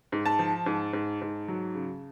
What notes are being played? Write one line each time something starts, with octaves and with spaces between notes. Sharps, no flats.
G#2
A5
F3
G#2
G#2
G#2
F#3
C#3